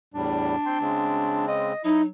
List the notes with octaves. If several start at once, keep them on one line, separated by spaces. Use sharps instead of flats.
E2 A2 G3 D4
C4 G5 C6
C#3 G#3 C4
D#5
F#3 D#4 E4 D#5